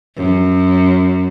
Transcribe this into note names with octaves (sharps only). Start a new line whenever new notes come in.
F#2